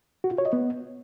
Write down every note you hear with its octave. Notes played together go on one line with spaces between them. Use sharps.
F#4
F4
C#5
D#5
B3